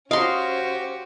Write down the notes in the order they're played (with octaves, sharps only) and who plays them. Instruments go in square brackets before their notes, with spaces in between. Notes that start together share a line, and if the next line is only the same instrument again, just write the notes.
[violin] C#4 C5 [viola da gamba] F#4 G4 [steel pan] D#5 [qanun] F5 C6